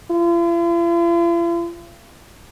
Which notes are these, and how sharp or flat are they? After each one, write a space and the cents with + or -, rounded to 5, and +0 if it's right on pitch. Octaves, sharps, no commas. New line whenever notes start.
F4 -45